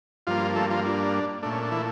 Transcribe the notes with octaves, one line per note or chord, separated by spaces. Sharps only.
G2 F3 A#3 F4
A3 A4
F3 F4
D4
A#2 A3 D4
C#4
D4
E3 E4